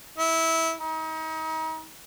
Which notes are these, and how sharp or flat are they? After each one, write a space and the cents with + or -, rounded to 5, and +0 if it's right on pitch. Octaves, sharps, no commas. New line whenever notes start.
E4 -15
D#4 +35